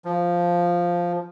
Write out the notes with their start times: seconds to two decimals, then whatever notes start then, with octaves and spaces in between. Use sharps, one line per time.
0.05 F3